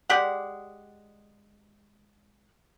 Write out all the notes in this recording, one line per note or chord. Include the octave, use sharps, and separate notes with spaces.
G#3 G4 D5 F#5